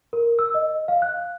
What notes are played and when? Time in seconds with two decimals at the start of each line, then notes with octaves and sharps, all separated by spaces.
0.13 A#4
0.39 E6
0.54 D#5
0.88 F5
1.02 F#6